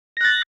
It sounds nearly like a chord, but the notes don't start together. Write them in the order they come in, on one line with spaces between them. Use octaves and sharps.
A#6 F#6 A6